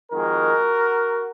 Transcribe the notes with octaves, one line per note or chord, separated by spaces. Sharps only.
F2 D#3 G#3 F#4 A#4